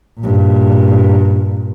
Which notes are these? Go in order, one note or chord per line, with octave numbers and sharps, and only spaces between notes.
G2 A#2